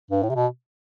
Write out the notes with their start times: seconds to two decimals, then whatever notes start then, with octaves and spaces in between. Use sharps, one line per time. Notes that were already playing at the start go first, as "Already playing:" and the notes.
0.11 G2
0.23 A2
0.30 C3
0.35 B2